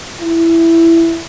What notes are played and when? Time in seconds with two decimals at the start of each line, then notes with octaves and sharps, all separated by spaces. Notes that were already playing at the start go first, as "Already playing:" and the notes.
0.21 E4